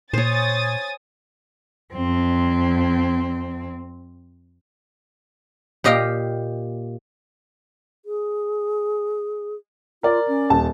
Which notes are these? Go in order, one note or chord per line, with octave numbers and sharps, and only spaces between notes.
A#2 C5 C#5 G#5 D#6 A6
F2 C4
A#2 G4 D#5 F5 G5
G#4
F4 A#4 D5
C#4
D#1 A5